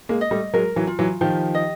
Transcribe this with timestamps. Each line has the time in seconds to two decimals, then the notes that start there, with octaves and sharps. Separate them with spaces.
0.09 G#3 A#3
0.21 D#5
0.31 G3 A3
0.53 F#3 G#3 A#4
0.76 E3 F#3
0.87 F4
0.99 E3 F#3
1.21 D#3 F3 G4
1.55 D#5